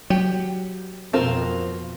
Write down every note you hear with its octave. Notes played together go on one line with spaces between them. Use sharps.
F#3 G4
F2 B2 C4 F4 A#4